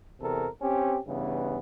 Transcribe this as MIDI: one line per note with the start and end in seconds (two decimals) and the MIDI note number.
0.20 0.47 40
0.20 0.47 48
0.20 0.47 69
0.20 0.47 70
0.61 0.98 60
0.61 0.98 61
0.61 0.98 67
1.07 1.58 43
1.07 1.58 49
1.07 1.58 52
1.07 1.58 59